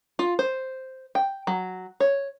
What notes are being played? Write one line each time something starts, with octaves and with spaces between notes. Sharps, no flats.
F4
C5
G5
F#3
C#5